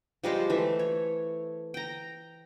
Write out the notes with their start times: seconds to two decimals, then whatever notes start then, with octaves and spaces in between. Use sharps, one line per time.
0.24 F3 G3 G#3 C5
0.50 E3 A3 E5
0.79 C#5
1.74 G5 A#5